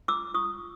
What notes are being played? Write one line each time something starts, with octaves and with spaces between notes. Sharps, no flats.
F4 D6 E6
F4 C#6 D#6